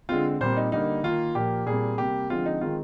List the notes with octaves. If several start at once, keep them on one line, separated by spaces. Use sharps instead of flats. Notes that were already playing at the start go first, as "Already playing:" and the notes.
D3 G#3 C4 F4
A#2 G3 C4 C5
D#4
D3 G3 A#3 D#4
D#3 A#3 F4
A#2 F3 A#3 G4
A#2 G3 C4 G#4
C3 G3 A#3 G4
D3 F3 G#3 C4 F4
D#4
D#3 G#3 C4 F4